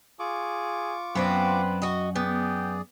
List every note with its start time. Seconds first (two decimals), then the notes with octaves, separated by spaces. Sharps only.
0.19 F4 G#4 C#6 D6
1.15 F#2 B3 C4 D4 B4
1.82 F#4 D#5
2.16 B3 G#4 D5 G5